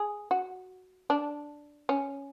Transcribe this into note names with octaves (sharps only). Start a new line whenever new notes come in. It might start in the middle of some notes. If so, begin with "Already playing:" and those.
Already playing: G#4
F#4
D4
C#4